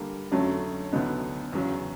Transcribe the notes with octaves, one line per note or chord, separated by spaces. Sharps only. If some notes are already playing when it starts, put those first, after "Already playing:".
Already playing: D3 G3 A#3
F2 D3 F#3 A3 C#4
D2 D3 F#3 B3 D#4
E2 C#3 F#3